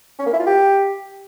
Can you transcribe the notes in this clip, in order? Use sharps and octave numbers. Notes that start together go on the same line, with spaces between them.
C#4
A#3
E4
F4
G4